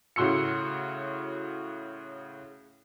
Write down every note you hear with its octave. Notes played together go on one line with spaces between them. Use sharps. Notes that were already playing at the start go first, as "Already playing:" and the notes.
A2 C#3 F#4 C6 E6 C#7